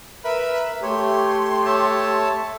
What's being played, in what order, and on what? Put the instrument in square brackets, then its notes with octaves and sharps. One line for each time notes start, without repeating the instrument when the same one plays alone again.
[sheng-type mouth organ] A#4 B4 B5 [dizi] E5
[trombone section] A3 G4 [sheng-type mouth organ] C#5 [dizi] C6
[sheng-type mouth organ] C#5 E5 A5